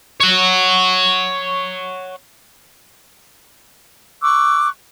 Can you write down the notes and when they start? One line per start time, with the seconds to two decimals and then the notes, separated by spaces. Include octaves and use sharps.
0.20 C#5 F#5
4.22 C#6 D6 E6 F#6